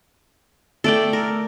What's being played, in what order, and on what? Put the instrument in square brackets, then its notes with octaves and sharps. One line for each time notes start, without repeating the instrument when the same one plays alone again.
[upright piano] A3 [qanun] A4 D5 G5
[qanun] A#4